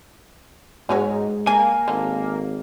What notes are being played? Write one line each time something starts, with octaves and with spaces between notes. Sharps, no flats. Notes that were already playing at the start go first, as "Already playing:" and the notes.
G#2 F#3 G#3 C#4 F#4
A#3 G#5
G#1 D3